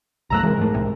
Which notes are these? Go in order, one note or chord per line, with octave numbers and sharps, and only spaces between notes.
C2 F#2 A3 A#5 E6 F#6
C#2 E3 F#3 G#3 C4 A#4
G#2 A3
C2 A2 C3